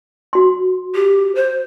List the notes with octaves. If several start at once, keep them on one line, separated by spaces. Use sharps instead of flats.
F#4 C6
G4
C5